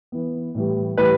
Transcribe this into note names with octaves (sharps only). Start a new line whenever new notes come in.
E3 B3
A2 E3 G3
A2 E3 G3 B4